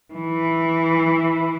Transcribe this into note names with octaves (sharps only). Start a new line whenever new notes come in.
E3